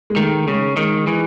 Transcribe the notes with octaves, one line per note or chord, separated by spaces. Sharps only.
G#3
D#3 A3
C#3 G#3
D#3 G#3
E3